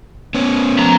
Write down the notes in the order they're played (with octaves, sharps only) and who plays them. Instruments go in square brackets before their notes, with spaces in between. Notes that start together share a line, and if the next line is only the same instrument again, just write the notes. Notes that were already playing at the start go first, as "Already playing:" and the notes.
[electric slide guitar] B3 C#4
[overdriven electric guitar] F3 A#5